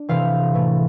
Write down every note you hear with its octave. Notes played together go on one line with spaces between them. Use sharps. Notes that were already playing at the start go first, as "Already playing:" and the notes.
Already playing: D4
C3 E3 A3 C4 F5
A2 E3 A3